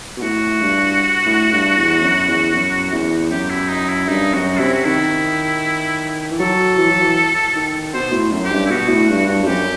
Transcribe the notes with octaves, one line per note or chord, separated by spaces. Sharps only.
B2
A2 F#4
G2
A2
G2
E2
F#2
E2
F#2
E2
F#2 G4
E4
D#4
E4
G2 D#4
F#2 F#4
C3 E4
F#4
D#3 E4
E3
F#3 A4
E3
F#3
E3
D#3
B2 C5
A2
F#2
G4
G2
E4
B2 F#4
A2
G2
G2
G2
F#2 G4